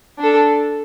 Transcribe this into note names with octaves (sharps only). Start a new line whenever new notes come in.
D4 A4